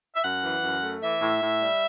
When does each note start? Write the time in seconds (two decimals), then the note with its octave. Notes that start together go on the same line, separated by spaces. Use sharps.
0.15 E5
0.23 F#2 F#5
0.43 E3
0.63 F#2
0.82 A3
1.02 E3 E5
1.21 A2
1.41 A2
1.60 G3